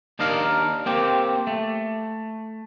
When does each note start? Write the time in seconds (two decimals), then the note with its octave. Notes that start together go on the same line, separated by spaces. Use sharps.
0.19 D#2 D4 D#4 A#4 F5
0.86 A#3 C4 G4
1.47 A3